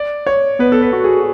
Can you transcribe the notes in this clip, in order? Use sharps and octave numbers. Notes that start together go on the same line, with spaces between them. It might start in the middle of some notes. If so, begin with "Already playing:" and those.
Already playing: D5
C#5
B3 B4
A4
B4
F#4
G#4